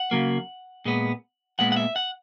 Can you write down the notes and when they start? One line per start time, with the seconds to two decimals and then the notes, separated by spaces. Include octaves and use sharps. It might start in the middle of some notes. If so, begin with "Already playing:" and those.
Already playing: F#5
0.11 C#3 F#3 A#3
0.85 A#2 G#3 B3
1.59 A#2 G#3 B3 F#5
1.72 F#5
1.76 E5
1.96 F#5